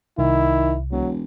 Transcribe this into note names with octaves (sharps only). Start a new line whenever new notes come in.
C2 D#3 E4
E1 F#3